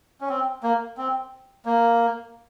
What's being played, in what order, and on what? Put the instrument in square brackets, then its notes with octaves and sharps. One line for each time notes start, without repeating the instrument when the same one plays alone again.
[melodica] C#4
C4
A#3
C4
A#3